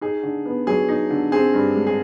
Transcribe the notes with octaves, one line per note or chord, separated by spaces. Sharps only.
D#4 G#4
D3
B3
F#3 G#4
D#4
D3
C4 G#4
G2
G#3
G#4